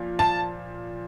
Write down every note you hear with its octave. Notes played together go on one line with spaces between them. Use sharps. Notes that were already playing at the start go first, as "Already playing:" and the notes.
Already playing: A#2 F3
A5